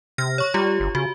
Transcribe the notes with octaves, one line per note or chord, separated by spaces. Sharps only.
C3 F6 A#6
C#5 C#6
G3 F4 G4
G1
C#3 F#4